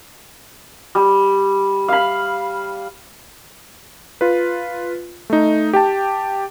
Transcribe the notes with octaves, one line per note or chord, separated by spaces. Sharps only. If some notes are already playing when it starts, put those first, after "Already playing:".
G3
F5 B5
F4 B4
A3 D#4
G4 G5 A5